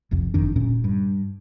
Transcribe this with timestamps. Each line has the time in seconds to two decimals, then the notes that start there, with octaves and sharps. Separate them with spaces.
0.11 F1 C2 F2
0.34 F#1 F2 D#3 D4
0.56 D1 A#2 C#4
0.84 G2